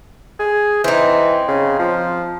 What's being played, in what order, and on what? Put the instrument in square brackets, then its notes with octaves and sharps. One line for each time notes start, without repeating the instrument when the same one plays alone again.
[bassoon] G#4
[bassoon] E3 [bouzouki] C4 D#4
[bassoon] C#3
F3